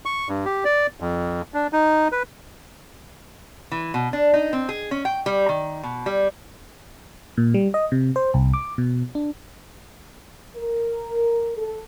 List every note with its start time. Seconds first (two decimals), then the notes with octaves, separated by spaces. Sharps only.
0.05 C#6
0.29 G2
0.45 G4
0.65 D5
1.00 F2
1.54 D4
1.73 D#4
2.12 B4
3.71 E3
3.94 B2
4.13 D4
4.34 D#4
4.53 C4
4.69 G#4
4.91 C#4
5.05 G5
5.26 G3
5.49 D#3
5.83 B2
6.06 G3
7.38 A#2
7.54 G3
7.74 D#5
7.92 C3
8.16 C5
8.34 C2
8.54 D6
8.78 B2
9.15 D4
10.56 A#4
11.56 A4